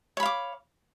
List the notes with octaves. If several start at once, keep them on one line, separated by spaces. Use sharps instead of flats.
C#5 F5 B5 D6